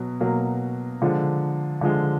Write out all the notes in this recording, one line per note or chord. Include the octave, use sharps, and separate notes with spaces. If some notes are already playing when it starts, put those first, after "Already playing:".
Already playing: B2 F#3
B2 F#3 A#3
D3 F3 G#3
D3 F3 G#3